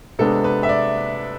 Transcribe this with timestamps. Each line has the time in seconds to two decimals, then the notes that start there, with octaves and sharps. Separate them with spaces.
0.19 C3 G#3 B3 D4 A4
0.44 B4
0.63 E5
0.69 D5